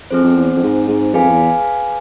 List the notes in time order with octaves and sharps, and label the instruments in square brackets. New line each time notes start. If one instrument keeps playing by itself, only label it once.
[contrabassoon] F2 [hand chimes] C4 G#4 C5
[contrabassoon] F2
E2
F2
G#2
G#2
[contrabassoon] F2 [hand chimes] G#4 B4 F5 G#5
[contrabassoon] F2
E2